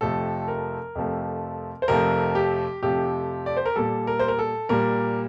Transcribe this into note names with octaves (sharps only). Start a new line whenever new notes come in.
F2 C3 F3 A3 A4
A#4
F2 C3 F3 A3
C5
F2 C3 F3 A3 A#4
G4
F2 C3 F3 A3 G4
D5
C5
A#4
A#2 G3 A4
A#4
C5
A#4
A4
A#2 G3 A#4